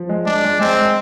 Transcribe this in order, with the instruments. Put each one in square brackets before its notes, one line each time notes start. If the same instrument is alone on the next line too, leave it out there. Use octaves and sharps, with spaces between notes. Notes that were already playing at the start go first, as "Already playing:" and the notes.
Already playing: [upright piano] F3
G#3
[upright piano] G#3 [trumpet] D4
[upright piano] G#3
[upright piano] G#3 [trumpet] C4
[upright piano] G#3